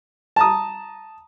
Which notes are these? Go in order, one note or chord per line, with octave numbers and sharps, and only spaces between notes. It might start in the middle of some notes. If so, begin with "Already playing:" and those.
A5 A#5 D#6